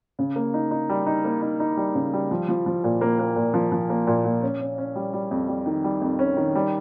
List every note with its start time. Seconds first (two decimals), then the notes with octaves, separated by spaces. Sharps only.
0.19 C#3
0.36 A#3
0.54 D#4
0.71 D#4
0.89 G3
1.07 D#4
1.24 A#3
1.42 D#4
1.60 D#4
1.77 G3
1.95 C#3
2.13 G3
2.31 F3
2.49 F3
2.66 F3
2.84 A#2
3.01 A#3
3.19 A#3
3.36 A#2
3.54 F3
3.72 F3
3.90 A#3
4.07 A#2
4.25 A#2
4.42 C#4
4.60 C#4
4.78 C#4
4.96 G3
5.13 G3
5.31 F2
5.48 G3
5.66 D#3
5.84 G3
6.02 F2
6.19 C#4
6.37 D#3
6.55 G3